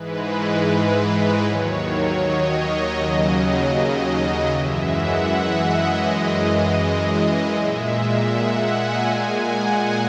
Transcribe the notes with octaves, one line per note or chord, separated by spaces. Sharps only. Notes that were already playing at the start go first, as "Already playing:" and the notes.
Already playing: G#2 E3 G#3 B4
D#2 D#3 F#3 C#5
C#5
D#5
D#2 C#3 F#3
D#5
D#5
F#2 E3 G#3 E5
F#5
E5
D#5
F#2 E3 G#3
A#2 G#3 E5
E5
F#5
G#5
A#2 G#3 G#5
F#5